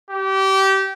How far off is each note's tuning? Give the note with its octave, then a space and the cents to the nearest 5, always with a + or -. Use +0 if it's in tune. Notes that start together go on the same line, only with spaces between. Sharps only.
G4 -25